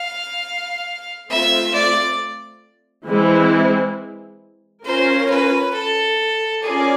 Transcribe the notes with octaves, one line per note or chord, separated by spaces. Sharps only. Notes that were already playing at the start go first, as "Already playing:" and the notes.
Already playing: F5
A3 C4 F4 E5
D5
E3 G#3 C4 E4
C#4 F4 A#4 C5
B4
A4
C#4 F4 G#4 A#4 D5